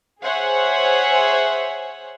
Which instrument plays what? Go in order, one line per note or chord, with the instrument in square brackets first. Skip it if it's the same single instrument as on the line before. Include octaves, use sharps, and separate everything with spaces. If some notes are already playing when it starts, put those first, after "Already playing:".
[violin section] G#4 C5 C#5 E5 F#5 G#5